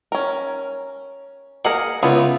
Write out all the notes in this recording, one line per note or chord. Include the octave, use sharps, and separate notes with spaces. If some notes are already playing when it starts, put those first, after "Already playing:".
C#4 A#4
A#3 G#4 A#4 F#5
C#2 B3 E4 F4